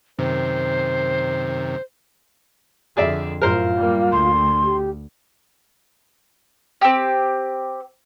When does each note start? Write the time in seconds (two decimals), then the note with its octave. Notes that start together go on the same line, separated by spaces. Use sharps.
0.19 F#2 C3 D#3 C5
2.97 F2 D3 G#4 D5 E5
3.42 F#2 A2 F4 A#4 C5
3.76 G3 A#3
4.12 D2 C6
4.64 G4
6.81 C4 G4